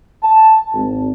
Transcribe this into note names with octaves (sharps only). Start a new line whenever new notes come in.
A5
G#1